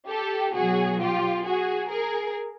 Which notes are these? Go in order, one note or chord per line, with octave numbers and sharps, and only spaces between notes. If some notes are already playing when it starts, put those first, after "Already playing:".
G4 A4
B2 F#3 F#4 G#4
F4 G4
F#4 G#4
G#4 A#4